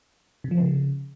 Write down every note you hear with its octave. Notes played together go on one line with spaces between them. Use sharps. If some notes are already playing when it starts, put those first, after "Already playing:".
C3
F3
C#3